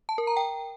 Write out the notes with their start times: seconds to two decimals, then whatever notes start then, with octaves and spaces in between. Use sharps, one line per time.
0.09 A5
0.18 A#4
0.27 A#5
0.37 G5